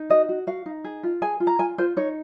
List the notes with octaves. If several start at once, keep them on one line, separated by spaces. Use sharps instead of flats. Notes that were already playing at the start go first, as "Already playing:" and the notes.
Already playing: D#4
F#4 D#5
F#4
F#4 F5
D#4
G#4
F4
G#4 G#5
F4
A#5
F4 G#5
F4 C5
D#4 C#5